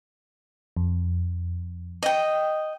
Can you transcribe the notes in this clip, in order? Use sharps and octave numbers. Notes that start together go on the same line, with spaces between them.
F2
D#5 G5